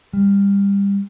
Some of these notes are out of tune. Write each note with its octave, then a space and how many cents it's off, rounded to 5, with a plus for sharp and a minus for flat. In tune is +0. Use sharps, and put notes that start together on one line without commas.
G3 +25